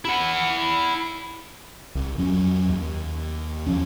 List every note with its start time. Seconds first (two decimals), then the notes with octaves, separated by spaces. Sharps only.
0.05 E4 F#5
1.95 C2
2.18 F2 F#3 C#4
2.69 D#2
3.67 E2 F3 C#4